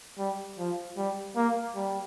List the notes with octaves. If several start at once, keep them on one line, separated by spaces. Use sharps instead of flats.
G3
F3
G3
A#3
G3